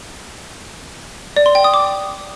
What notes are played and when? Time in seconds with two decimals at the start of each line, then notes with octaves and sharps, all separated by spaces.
1.36 D5
1.46 C6
1.55 G5
1.64 D#6
1.74 D6